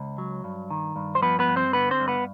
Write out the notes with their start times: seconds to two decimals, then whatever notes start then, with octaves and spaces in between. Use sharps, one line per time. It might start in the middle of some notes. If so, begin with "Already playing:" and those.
Already playing: C#2
0.18 F#3
0.44 G2
0.70 D#3
0.96 G2
1.15 C5
1.22 F3 B3 B4
1.39 B3 B4
1.48 G2
1.56 C4 C5
1.73 D3 B3 B4
1.91 C4 C5
2.00 G2
2.08 B3 B4